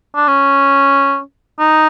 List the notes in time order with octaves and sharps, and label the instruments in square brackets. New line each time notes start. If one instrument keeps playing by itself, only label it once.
[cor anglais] D4
C#4
D#4